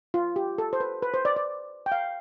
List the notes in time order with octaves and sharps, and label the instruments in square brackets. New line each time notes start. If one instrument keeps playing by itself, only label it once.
[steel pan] F4
G4
A4
C5
B4
B4
C5
D5
D5
G5
F5